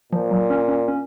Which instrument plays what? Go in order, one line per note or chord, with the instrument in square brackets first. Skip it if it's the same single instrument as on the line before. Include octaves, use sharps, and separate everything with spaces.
[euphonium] A#2 [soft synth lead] F3
[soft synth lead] F#3
C#4
C#4
C#4